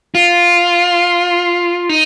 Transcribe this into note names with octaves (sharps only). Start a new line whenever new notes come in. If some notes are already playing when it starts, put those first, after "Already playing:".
F4
D#4